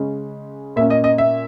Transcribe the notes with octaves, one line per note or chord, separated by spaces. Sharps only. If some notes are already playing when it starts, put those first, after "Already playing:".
Already playing: C#3 G#3 C#4
A#2 A#3 C#4 E5
D#5
D#5
E5